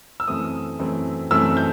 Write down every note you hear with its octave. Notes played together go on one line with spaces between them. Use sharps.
E6
F#2 E3 A3 C4 D#6
F#2 E3 A3 C4
F#2 E3 A3 C4 E6
G6